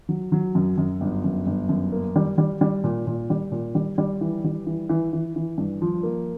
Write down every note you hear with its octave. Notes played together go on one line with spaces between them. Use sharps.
F#3
F#3
F#2
F#2
G1
F#2
G1
F#2
A#3
G3
G3
G3
A#2
A#2
G3
A#2
G3
G3
E3
G3
E3
E3
E3
E3
G2
F3
A#3